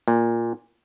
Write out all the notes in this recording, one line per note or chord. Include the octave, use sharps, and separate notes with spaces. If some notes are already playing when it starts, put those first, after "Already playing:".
A#2